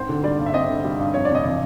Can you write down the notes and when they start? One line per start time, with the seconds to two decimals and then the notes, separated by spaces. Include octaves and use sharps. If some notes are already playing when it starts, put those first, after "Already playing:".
Already playing: G#2 C4 C5
0.09 D3
0.24 G3 D5
0.39 G2
0.46 E5
0.53 C4 D#5
0.70 D3
0.84 G3
0.99 G2
1.14 F2 C#5
1.25 C3 D5
1.35 D#5
1.45 E3